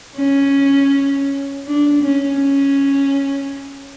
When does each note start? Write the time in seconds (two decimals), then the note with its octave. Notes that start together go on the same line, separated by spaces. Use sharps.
0.17 C#4
1.66 D4
2.02 C#4
2.40 C#4